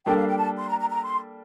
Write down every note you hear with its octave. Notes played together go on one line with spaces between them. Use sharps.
G3 A#3 D4 A4 G5
F5
G5
A5
C6
A#5
A#5
A#5
C6